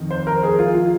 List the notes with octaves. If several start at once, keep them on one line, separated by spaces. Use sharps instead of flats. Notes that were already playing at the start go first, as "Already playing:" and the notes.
Already playing: F2 D#3
C5
A#4
G#4
F4
F4